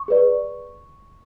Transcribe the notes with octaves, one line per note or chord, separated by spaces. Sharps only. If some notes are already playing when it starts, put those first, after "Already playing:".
Already playing: C#6
G#4 B4 D5